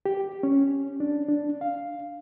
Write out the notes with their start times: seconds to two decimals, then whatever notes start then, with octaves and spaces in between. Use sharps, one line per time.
0.06 G4
0.43 C#4
1.00 D4
1.29 D4
1.61 F5